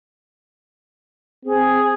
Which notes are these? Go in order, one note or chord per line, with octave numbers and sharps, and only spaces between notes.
C4 G#4